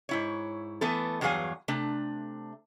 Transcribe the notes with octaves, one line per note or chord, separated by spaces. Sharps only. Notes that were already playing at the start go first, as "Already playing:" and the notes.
G#2 E4 C#5
E3 A3 B3 A4
E2 G2 F#3 G#4 F5 G#5
C3 A3 D4